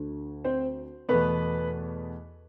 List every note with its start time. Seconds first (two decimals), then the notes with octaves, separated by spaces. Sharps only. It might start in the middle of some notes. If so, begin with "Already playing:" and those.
Already playing: D2 D3 A3
0.44 C4 C5
1.09 E2 B2 A3 B3 B4